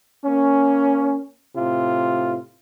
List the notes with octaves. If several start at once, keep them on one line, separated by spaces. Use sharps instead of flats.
A#3 C#4
A2 C3 F4